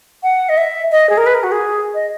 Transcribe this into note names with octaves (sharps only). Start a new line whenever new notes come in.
F#5
D#5
E5
D#5
G#4
A#4
B4
A#4
F#4
G#4
D#5